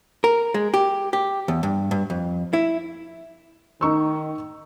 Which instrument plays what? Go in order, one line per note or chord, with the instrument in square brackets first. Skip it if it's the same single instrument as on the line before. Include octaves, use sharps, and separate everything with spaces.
[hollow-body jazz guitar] A#4
G#3
G4
G4
E2
G2
G2
F2
E4
[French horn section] D#3 [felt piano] D#4 C#6 E6